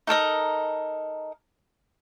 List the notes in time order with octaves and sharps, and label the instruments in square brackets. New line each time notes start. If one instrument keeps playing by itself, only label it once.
[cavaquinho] D#4 A4 A#4 D#5